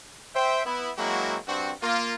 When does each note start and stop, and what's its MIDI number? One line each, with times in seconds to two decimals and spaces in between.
0.35 0.62 72
0.35 0.62 76
0.35 0.62 79
0.66 0.90 59
0.66 0.90 64
0.97 1.37 54
0.97 1.37 56
0.97 1.37 58
0.97 1.37 60
0.97 1.37 64
0.97 1.37 66
1.47 1.71 43
1.47 1.71 60
1.47 1.71 66
1.82 2.15 58
1.82 2.15 65